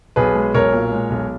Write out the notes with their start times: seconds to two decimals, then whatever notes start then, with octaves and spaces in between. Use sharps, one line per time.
0.16 B1 G#4 B4
0.35 G#3
0.54 B1 A#4 C#5
0.72 A#2
0.92 G#3
1.10 B1